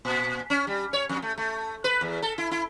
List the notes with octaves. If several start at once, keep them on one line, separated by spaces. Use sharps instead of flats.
A#2
C#4
G3
C#5
F2
A3
A3
B4
E2
A4
E4
E4